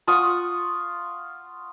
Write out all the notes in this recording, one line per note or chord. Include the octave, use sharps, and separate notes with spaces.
F4 F#5 C#6 D#6